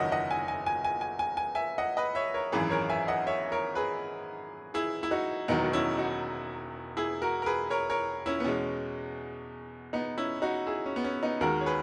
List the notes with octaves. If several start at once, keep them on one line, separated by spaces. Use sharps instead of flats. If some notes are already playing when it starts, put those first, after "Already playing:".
Already playing: F#1 E2 D#3 F#3 C#5 D#5 E5 F#5
D#5 F#5
G#5
G#5
G#5
G#5
G#5
G#5
G#5
E5 G#5
D#5 F#5
B4 D#5
C#5 E5
A#4 C#5
G#1 F#2 E3 G#4 B4
A#4 C#5
E5 G#5
D#5 F#5
C#5 E5
A#4 C#5
G#4 B4
E4 G#4
E4
D#4 F#4
E1 E2 D#3 F#3 B3 D#4
F#4
C#4 E4
D#4 F#4
E4 G#4
F#4 A#4
A#4
G#4 B4
A#4 C#5
A#4 C#5
C#4 E4
B3
E2 B2 G#3 C#4
B3 D#4
C#4 E4
D#4 F#4
E4 G#4
C#4
B3
C#4
B3 D#4
D#2 D#3 G#3 F#4 A#4
C#5
G#4 B4